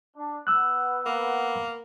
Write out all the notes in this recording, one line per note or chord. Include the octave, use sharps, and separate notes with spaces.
D4
B3 E6 F#6
A#3